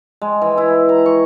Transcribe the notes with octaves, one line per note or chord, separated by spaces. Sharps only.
G#3
E3
E4
A#5
C#6